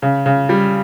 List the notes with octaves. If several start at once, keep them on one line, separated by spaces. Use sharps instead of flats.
C#3
C#3
G3